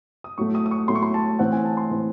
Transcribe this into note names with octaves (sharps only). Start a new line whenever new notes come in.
D#6
A2 F#3 A3 C#6
D#6
D#6
C#6
A2 F#3 A3 C6
C#6
C6
A5
A2 E3 C4 F#5
G#5
A5
C6
A2 E3 C4